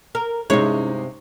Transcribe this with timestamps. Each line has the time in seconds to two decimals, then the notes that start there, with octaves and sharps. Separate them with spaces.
0.15 A#4
0.50 G2 C3 G#3 C#4 D#4 E4 G#4 C#5